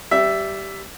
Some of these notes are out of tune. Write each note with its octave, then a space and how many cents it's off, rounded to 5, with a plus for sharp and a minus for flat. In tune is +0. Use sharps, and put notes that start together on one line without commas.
G3 -10 E5 +10